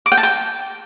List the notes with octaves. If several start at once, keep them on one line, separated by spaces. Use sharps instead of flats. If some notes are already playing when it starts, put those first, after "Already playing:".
D6
G5
A5
G5